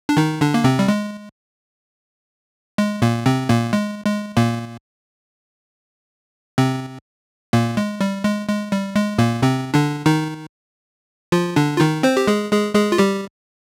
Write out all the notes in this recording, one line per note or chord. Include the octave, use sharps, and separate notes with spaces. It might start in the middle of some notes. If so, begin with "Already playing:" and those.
D4
D#3 D#4
D3 D4
A#3
C3 C4
G3
G#3
G#3
A#2 A#3
C3 C4
A#2 A#3
G#3
G#3
A#2 A#3
C3 C4
A#2 A#3
G#3
G3
G#3
G#3
G3
G#3
A#2 A#3
C3 C4
D3 D4
D#3 D#4
F3 F4
D3 D4
F4
D#3 D#4
C4 C5
G4
G#3 G#4
G#3 G#4
G#3 G#4
F4
G3 G4